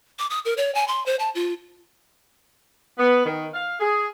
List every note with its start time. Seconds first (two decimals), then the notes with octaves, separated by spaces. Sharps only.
0.19 D6
0.30 D#6
0.45 A#4
0.57 C#5
0.75 G#5
0.88 C6
1.06 C5
1.19 A5
1.35 F4
2.98 B3
3.26 D#3
3.54 F5
3.80 G#4